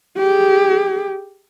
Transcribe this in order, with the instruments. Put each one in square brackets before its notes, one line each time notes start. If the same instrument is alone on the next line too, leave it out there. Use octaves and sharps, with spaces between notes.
[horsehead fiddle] G4 G#4